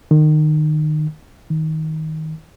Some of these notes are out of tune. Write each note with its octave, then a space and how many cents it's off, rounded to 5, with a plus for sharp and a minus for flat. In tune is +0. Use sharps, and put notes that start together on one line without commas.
D#3 -25
D#3 +20